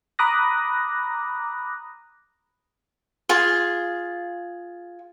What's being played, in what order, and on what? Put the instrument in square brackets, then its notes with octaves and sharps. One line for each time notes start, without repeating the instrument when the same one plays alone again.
[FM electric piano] A#5 B5 D6 D#6 F#6 A#6
[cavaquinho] F4 G#4 C6